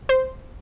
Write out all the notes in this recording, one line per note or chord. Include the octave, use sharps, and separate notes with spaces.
C5